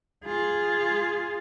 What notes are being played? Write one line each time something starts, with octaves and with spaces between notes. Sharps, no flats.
F4 G#4